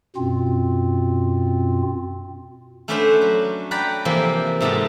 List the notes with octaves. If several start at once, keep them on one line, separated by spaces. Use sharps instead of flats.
F#2 B2 C4 F4
A3 C#4 D4 B4 C5 F#5
F#3
B4 D5 F#5 G5 A#5 B5
C3 E3 F3 A#3
G#2 C3 B3 A5